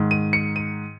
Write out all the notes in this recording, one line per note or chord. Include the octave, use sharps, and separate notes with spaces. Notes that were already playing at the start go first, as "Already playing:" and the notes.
Already playing: G#2 D#3
D#7
C#7
D#7